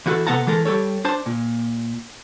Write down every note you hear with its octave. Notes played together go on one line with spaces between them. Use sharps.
E2 E4 F#4 G4 A4
C3 B3 A4 F#5 A5 A#5
E3 G#3 A4 A#4
G3 G4 A4 C#5
D4 C5 A5
A#2